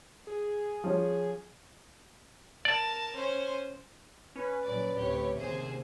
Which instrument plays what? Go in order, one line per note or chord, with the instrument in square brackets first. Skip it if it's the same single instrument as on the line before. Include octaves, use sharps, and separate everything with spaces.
[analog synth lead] G#4
[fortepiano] F3 C#4
[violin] A#4 A5 [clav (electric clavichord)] D5
[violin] C#4 C5
[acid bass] C#4 [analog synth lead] B4
[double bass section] A#2 C#3 F#3 [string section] D5
[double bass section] D2 A2 C3 [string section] G4 C#5
[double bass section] D#2 C3 [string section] A#3 G#4 C5